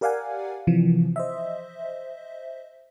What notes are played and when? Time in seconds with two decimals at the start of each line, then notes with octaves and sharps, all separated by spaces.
0.01 G4 A#4 D5 F5 F#5 G#5
0.67 C3 E3 F3
1.16 C5 D#5 E5